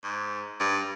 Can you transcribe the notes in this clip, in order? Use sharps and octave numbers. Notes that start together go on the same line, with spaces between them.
G#2
G2